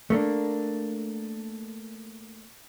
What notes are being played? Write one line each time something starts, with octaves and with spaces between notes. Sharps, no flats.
A3 A#3 D4